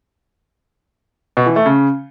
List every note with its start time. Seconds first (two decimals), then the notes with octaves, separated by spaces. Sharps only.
1.37 B2
1.46 E3
1.56 A3
1.66 C#3